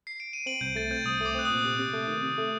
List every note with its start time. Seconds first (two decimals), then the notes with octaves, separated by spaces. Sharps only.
0.07 C7
0.20 D7
0.33 D#7
0.46 C4 D7 F#7
0.61 C2 G6
0.76 A3 A6
0.91 C4 G6
1.05 C2 D#6
1.21 A3 D6
1.35 C4 F#6
1.45 A#2 D#6
1.64 C3
1.79 C3
1.93 A3
2.08 D#3
2.23 C3
2.38 A3